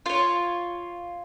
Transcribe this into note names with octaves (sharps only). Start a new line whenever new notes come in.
F4 C#5